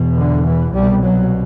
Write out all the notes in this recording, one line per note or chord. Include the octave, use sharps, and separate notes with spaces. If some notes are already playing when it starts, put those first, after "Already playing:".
Already playing: E2 B2
D3
E3
C2 B2 G3
F#3